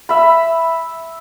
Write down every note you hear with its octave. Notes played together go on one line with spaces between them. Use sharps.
E5 B5